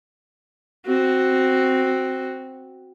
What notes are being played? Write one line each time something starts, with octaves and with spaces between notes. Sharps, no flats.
C4 F#4